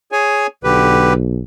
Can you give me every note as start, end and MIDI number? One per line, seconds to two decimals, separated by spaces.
0.12 0.47 68
0.12 0.47 73
0.12 0.47 80
0.64 1.43 35
0.64 1.13 50
0.64 1.13 67
0.64 1.13 71